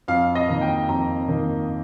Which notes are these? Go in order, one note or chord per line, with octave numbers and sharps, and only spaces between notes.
F2 F5
D#5
D#3 A#3
G5
F2 A#5
D#3 A#3